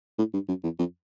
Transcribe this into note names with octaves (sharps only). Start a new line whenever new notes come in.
A2
G2
F#2
E2
F2